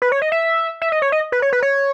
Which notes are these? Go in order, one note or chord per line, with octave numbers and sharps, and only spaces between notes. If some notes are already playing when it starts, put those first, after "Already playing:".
B4
C#5
D#5
E5
E5
D#5
C#5
D#5
B4
C#5
B4
C#5